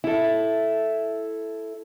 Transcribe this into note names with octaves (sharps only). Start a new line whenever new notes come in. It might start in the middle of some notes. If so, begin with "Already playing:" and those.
E4 A4